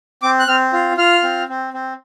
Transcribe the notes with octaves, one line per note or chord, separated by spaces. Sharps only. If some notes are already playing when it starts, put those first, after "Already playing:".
C4 D6
F#6
C4 F6
F4
F4 F6
C4
C4
C4